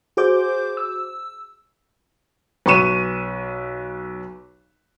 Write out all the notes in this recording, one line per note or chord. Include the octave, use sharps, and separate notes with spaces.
F#4 G#4 C5 D6 G6
E6
B1 B4 C#6 D#7 E7